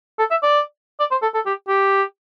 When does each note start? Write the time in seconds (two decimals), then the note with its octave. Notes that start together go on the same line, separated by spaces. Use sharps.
0.19 A4
0.31 E5
0.43 D5
1.00 D5
1.11 C5
1.22 A4
1.35 A4
1.46 G4
1.68 G4